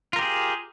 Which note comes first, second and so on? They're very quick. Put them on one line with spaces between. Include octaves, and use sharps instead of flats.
F4 A#4 G4 G#4